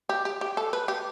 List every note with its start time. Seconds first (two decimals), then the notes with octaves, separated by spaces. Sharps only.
0.09 G4
0.25 G4
0.41 G4
0.57 A4
0.73 B4
0.88 G4